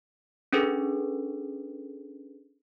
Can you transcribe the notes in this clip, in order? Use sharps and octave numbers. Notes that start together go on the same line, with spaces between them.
C#4 D4 G#4 A4 B4